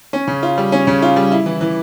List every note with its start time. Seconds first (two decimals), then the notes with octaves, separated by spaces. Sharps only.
0.13 C#4
0.28 C#3
0.43 F4
0.58 G3
0.72 C#4
0.87 C#3
1.02 F4
1.16 G3
1.32 E4
1.46 E3
1.61 E3